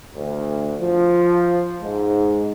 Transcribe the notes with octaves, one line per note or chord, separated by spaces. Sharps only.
D2
F3
G#2